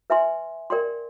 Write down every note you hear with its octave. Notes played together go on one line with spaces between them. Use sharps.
B4 E5 G#5 C6
A#4 D5 G5 C6